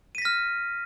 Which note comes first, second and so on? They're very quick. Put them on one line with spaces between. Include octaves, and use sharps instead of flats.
D#7 B6 A#6 F6